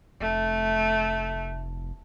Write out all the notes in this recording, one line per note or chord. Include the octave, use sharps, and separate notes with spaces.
F1 A3